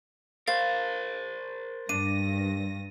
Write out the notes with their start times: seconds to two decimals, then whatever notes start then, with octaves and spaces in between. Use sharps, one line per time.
0.48 A#4 C5 F5 A6
1.89 G2 D4 A#6 D#7